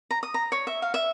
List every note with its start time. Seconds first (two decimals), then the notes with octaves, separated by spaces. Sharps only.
0.11 A#5
0.23 D#6
0.34 A#5
0.52 C#5
0.67 E5
0.82 F5
0.94 E5